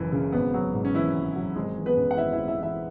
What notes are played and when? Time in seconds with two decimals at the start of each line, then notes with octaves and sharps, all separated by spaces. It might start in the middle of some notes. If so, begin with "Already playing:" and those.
Already playing: F#1 F#2 E3
0.12 C#3
0.32 G#1 B3
0.54 F#3
0.73 G#2
0.85 C#4
0.94 G#1 E3 E4
1.15 G#1
1.36 F#3
1.56 G#1 G#3 G#4
1.76 E3
1.86 B3 B4
1.97 F#2
2.11 F#5
2.17 G#1 E4 E5
2.32 E4 E5
2.37 G#1
2.48 E4 E5
2.59 E3 E4 E5